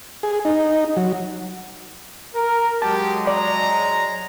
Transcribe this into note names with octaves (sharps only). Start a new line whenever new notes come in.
G#4
D#4
F#3
A#4
F#3 G#3 G4 A5
D5 A#5